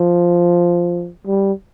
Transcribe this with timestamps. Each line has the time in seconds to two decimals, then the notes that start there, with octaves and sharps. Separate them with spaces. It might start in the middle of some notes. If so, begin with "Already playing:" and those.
Already playing: F3
1.27 G3